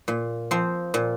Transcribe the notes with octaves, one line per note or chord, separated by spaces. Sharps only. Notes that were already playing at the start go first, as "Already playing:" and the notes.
A#2
F3 C4
A#2